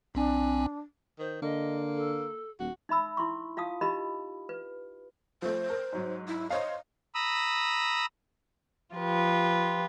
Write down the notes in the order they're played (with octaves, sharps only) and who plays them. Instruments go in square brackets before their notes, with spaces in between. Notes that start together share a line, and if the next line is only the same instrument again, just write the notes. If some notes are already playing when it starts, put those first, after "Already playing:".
[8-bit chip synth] B1 C4 G#5 [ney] D4
[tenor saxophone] D#3 [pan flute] C5
[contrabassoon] D3 [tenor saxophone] A#3 [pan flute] D#5
[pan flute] A4
[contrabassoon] D#1 [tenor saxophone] F#4
[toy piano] D#4 E5 B5 E6
E4 C6 C#6
F4 F5 A5 D#6
D#4 F4 G4 A#4 D#5 B5
B4
[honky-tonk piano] F3 A3 [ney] C5
[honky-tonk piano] A#4
G#2 F#3
[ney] E4
[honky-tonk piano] C5 C#5 F5 [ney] D#5
[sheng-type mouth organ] A#5 B5 D#6 E6
[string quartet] F3 F4 G4 B4